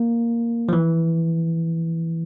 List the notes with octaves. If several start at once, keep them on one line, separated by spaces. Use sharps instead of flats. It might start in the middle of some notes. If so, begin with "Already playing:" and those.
Already playing: A#3
F3
E3